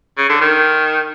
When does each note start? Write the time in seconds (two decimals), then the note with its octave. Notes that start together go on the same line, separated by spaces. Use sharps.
0.18 C#3
0.30 D3
0.42 D#3